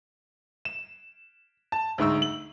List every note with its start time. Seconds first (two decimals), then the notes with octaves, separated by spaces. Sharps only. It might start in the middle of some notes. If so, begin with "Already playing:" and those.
0.65 E7
1.72 A5
1.98 D2 G#2 D#4 C#6 E6
2.22 F#7